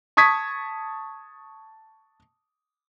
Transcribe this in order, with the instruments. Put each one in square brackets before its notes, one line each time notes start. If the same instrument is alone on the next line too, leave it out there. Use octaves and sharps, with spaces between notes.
[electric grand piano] A5 C#6 D#6 G#6 B6